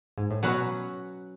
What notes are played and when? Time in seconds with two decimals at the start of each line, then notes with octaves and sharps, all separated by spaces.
0.18 G#2
0.31 A2
0.43 B2 F#3 C#4 F#4 B4